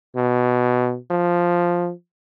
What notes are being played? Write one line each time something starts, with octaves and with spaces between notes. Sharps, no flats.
B2
F3